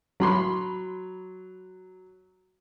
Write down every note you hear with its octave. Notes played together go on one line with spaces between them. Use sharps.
F#3 B5 C6